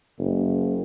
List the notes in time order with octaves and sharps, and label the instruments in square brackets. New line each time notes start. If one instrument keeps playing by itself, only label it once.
[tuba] F#1